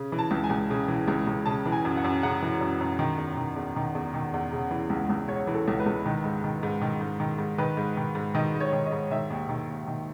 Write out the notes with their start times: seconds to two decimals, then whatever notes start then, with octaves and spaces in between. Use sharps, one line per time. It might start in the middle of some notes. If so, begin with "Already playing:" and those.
Already playing: C#3
0.12 E3
0.19 A5
0.31 C#2
0.44 G#5
0.50 C#2
0.70 C#3
0.88 E3
1.08 C#2
1.27 C#2
1.46 C#3 A5
1.66 E3
1.72 G#5
1.85 F#2
1.97 F#5
2.04 F#2
2.23 C#3 F#5
2.42 E3
2.61 F#2
2.80 F#2
2.99 D#3
3.18 E2
3.37 D#3
3.56 E2
3.76 D#3
3.95 E2
4.14 D#3
4.34 E2
4.52 C#3
4.71 E3
4.90 C#2
5.09 C#2
5.28 C#3 C#5
5.47 E3
5.54 A4
5.68 C#2
5.80 B4
5.86 C#2
6.06 D#3
6.24 G#2
6.44 D#3
6.63 G#2
6.82 D#3
7.01 G#2
7.20 D#3
7.39 G#2
7.58 D#3 B4
7.77 G#2
7.97 D#3
8.15 G#2
8.35 D#3 D#5
8.54 G#2
8.60 C#5
8.73 D#3
8.86 D#5
8.92 G#2
9.11 D#3 E5
9.30 D#2
9.49 D#3
9.69 D#2
9.87 D#3